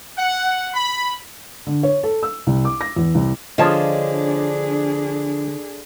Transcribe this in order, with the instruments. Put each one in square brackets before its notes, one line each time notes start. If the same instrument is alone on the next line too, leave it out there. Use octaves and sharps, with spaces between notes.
[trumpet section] F#5
B5
[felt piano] D3
C#5
A4
E6
C2
D6
A#6
E2
C2
[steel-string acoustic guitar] D3 [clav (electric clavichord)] F3 D#5 [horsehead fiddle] D4 G#4 [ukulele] F4 C#5 A5